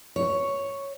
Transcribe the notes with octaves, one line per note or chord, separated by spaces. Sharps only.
C#5